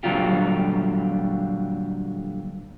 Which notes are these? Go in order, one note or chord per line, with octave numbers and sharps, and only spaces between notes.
A#2 D3 F#3 G3 F4 G4